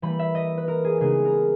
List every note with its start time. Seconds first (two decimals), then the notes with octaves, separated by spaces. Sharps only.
0.02 E3 G3 A#3 B5
0.19 E5
0.35 D#5
0.57 B4
0.68 A#4
0.84 G#4
1.00 C#3 G#3 B3 D#4 G#4
1.25 A#4